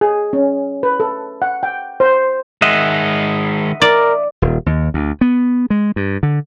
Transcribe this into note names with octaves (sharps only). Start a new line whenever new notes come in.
G#4
C#4
B4
A4
F#5
G5
C5
D#3 G#3 D#5 E5 F#5
A#4 D5
D#1
D#2
D2
B3
G#3
G2
D3